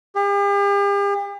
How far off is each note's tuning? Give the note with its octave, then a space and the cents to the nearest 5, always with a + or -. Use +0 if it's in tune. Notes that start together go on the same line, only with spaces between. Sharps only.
G4 +45